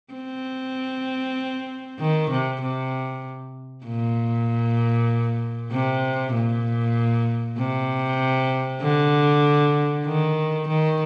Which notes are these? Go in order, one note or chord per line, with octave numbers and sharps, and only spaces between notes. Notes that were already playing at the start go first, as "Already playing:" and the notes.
C4
D#3
C3
C3
A#2
C3
A#2
C3
D3
D#3
D#3